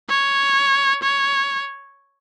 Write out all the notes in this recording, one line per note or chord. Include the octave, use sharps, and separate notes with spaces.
C#5
C#5